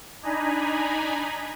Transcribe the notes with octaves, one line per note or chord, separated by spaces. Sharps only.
D4 D#4 G#5 A#5 B5